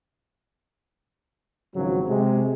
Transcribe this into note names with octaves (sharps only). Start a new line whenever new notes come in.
G#1 C#3 F3 F#3
C3 G#3